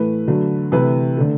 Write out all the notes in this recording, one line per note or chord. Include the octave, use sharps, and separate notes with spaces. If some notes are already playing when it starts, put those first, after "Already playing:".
Already playing: A2 E3 A3 B4
D3 F#3 A3
C3 E3 A3 B4
D3 A3